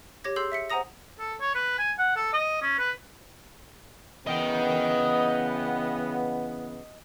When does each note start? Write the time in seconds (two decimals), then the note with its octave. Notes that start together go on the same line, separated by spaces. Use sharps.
0.24 G4 C#5 D6 G#6 A#6
0.36 G#4 C6 E6 G6 C7 F#7
0.52 E5 B6 C#7
0.70 C5 F#5 G#5 A#5 D#6 A#6
1.19 A4
1.40 C#5
1.55 B4
1.78 G#5
1.99 F#5
2.16 A4
2.33 D#5
2.62 C#4
2.78 B4
4.27 C#3 E3 B3 D#5 G5